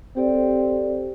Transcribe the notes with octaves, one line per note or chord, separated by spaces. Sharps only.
C4 G4 A4 D5